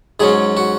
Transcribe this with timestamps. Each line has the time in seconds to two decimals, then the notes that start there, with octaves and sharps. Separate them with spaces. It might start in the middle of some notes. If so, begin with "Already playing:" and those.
0.20 G#2 F#3 C#4 G#4
0.57 F#4